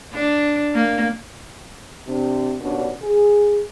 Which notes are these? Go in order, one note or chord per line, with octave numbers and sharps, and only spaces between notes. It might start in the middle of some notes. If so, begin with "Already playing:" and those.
D4
A#3
C3 D4
D#2 B2 C#4 D4
G#4